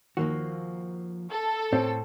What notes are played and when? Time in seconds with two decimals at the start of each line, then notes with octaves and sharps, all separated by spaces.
0.17 D#2 F3 A#3 F#4
1.31 A4
1.72 A2 C4 C5 C#5